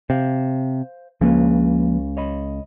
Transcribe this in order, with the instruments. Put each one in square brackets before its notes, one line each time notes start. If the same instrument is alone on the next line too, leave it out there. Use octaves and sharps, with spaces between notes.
[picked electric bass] C3 [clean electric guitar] C5 F5
[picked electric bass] C#2 C#3 [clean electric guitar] F3 A#3 B4
[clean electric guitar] C#5 D#5 B5